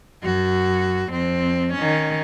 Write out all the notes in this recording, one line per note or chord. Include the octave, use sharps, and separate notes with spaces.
F#2 F#4
F2 C4
D#3 C#4